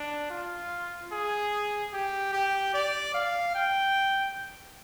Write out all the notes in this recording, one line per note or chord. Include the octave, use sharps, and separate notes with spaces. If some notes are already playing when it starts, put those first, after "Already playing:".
Already playing: D4
F4
G#4
G4
G4
D5
F5
G5